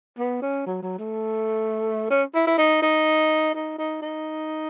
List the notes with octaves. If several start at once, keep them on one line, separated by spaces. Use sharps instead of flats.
B3
C#4
F#3
F#3
A3
C#4
E4
E4
D#4
D#4
D#4
D#4
D#4